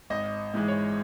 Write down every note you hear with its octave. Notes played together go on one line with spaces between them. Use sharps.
G#1 D#5
G#2 E3 G#3
C#5